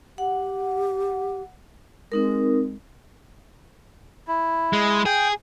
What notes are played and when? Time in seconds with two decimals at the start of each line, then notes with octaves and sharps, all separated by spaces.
0.18 G4 F#5
2.12 G#3 C4 D#4 A#4
4.27 E4
4.73 G#3
5.06 G#4 G5